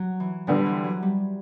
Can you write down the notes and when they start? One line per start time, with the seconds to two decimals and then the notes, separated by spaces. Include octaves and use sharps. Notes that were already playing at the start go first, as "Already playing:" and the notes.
Already playing: F#3
0.20 E3
0.47 D3 F3 G3 B3
0.66 E3
0.84 F#3
1.03 G3